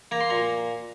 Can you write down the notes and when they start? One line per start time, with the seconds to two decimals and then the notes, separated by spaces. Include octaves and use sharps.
0.11 A#3 A#5
0.21 C6
0.30 A#2 A#5